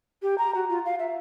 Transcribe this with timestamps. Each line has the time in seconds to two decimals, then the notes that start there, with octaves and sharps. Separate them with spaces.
0.22 G4
0.38 A#5
0.55 F#4
0.69 F4
0.85 F5
0.99 E5